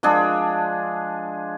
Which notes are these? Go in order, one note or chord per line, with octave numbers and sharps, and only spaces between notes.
F3 G#3 D4 G#4